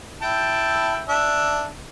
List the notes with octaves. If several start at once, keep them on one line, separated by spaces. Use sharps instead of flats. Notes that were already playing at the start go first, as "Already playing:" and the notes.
E4 G5 A5
D4 E5